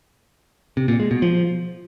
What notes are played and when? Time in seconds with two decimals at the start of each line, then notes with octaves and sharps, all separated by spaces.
0.77 C3
0.88 A#2
1.00 G#3
1.11 B2
1.22 F3